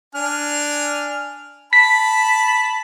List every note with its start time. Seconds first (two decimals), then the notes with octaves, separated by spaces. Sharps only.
0.15 D4 G#5 F6
1.73 A5 B5 B6